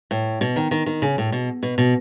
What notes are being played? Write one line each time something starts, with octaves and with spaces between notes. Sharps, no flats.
A2
B2
D#3
D#3
D#3
C#3
A2
B2
B2
B2